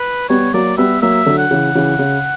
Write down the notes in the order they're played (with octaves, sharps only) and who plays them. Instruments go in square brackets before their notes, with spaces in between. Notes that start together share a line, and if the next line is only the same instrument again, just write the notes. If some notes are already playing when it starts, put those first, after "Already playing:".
Already playing: [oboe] B4
[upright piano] G3 B3 [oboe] C#5
[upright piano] F#3 A#3 [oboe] D5
[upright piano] G3 B3 [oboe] E5
[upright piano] F#3 A#3 [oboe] E5
[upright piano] D3 F#3
[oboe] F#5
[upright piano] C#3 E3
C#3 E3
C#3